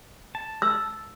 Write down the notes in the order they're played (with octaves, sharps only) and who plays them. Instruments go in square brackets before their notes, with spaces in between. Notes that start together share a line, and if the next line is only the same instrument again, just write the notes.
[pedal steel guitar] A5
[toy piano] E6